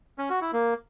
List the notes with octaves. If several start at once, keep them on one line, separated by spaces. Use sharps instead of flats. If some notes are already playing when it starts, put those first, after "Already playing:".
C#4
F#4
E4
A#3